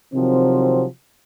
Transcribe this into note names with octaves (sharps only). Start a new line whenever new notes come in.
C3 D#3 F3 F#3 C4